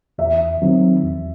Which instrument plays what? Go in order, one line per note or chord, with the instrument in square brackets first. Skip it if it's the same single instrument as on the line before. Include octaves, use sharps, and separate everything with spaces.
[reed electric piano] E2 [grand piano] E5
[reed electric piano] D#3 F#3 C4
E2